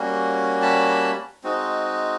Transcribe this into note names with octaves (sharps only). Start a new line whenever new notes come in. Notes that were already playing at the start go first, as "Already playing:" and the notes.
Already playing: G3 A#3 C#4 F#4
A5 B5
G#3 C4 D#4 F#4